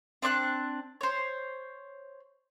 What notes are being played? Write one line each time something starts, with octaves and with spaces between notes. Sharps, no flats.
C4 D4 C#6 F#6
C5 C#5